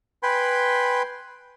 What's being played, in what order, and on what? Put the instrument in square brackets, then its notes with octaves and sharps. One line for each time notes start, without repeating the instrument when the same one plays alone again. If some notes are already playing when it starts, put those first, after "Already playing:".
[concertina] B4 G5 G#5 B5 C6